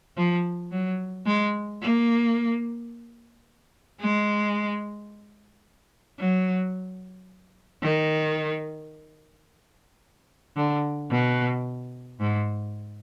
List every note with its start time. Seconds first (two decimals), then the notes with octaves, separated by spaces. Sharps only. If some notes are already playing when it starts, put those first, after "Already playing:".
0.17 F3
0.72 F#3
1.26 G#3
1.82 A#3
4.01 G#3
6.19 F#3
7.83 D#3
10.56 D3
11.11 B2
12.21 G#2